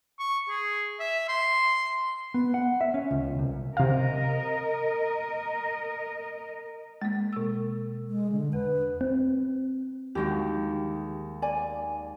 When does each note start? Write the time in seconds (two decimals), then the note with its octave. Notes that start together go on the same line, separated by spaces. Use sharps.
0.20 C#6
0.50 G#4
1.00 E5
1.29 C6
2.34 B3
2.54 F#5
2.81 E5
2.94 C#4
3.11 C#2
3.39 C2
3.77 C3 A#4 D#5 F5
7.02 G#3 A#3
7.33 B2 E6
8.08 G#3
8.32 D3
8.53 E2 B4
9.01 C4
10.15 D#2 G#3 F#4 G4
11.42 D5 G#5